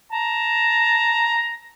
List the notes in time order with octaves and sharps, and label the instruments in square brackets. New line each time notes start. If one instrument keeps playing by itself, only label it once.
[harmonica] A5 A#5